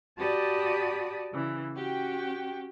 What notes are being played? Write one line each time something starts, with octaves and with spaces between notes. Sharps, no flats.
F#4 G4 D5 A5 B5 D#6
C#3 E3
C#4 F#4 G4 G5